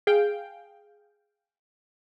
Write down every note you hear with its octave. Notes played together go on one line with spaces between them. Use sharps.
G#4 F5 G5